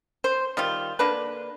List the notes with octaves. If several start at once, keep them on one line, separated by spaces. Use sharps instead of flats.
C5
D#3 G3 F4
D3 A#3 D4 B4